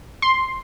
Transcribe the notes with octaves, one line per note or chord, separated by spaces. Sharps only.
C6